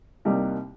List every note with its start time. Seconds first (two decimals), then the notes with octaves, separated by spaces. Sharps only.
0.25 C2 C3 G3 A#3 D#4